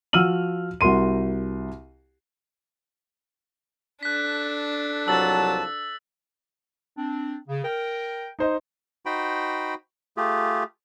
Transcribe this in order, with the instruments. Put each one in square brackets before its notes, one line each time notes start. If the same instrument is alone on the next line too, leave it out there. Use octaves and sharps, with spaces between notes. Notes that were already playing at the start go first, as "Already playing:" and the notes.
[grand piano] F3 F#4 E6 F6 D#7 F#7
C2 F#4 A#4 C6 D#7
[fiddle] D4 A4 [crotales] F#6 B6
[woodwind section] C2 F3 A5 [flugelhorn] F#3 [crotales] E6 A6
[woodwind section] C4 D4
C#3
A#4 G5
[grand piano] D#4 C5 D#5
[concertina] D#4 F#4 C5 G5 B5
A3 F4 G4 G#4